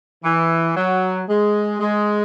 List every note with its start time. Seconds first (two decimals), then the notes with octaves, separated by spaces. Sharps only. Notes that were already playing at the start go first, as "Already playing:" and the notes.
0.23 E3
0.76 F#3
1.28 G#3
1.80 G#3